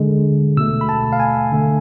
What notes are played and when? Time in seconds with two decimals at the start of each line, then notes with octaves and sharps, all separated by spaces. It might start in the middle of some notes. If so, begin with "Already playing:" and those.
Already playing: D3 G#3
0.57 B2 A3 E6
0.81 B5
0.89 A5
1.12 F5
1.20 G#5
1.51 D3 A3